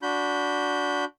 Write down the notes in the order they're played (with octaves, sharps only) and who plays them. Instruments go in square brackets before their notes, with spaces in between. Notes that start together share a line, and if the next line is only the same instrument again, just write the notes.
[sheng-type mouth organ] D4 F#4 B5 G6